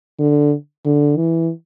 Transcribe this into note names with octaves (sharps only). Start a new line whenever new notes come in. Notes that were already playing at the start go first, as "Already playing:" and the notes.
D3
D3
E3